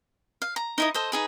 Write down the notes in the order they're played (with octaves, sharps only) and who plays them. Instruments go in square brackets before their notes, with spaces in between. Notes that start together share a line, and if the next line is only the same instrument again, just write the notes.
[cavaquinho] F5
A#5
D#4 E4 D#5
A4 C5 D#5
D#4 G#4 B4